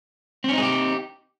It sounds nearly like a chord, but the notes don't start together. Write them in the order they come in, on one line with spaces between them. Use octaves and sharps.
C4 C#4 D#4 G#4 G4